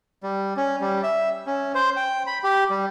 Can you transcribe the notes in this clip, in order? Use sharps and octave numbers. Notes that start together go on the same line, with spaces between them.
G3
C#4
G3
E5
C#4
C5
G5
B5
G4
G3